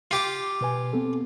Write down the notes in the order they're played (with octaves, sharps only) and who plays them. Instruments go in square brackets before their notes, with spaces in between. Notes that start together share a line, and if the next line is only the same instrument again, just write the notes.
[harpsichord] F4 G4 D6
[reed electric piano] B2 B4 G#5
B3 C4 A4